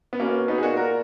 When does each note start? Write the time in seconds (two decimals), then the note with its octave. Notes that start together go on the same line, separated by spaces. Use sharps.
0.13 B3
0.20 B2 A#3 C#4
0.48 B2 B3 D#4
0.58 G#4
0.63 A#2 D#4 F#4
0.77 F#4 A#4